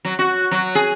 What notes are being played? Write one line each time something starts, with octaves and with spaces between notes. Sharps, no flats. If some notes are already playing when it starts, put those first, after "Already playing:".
F#3
F#4
F#3
G#4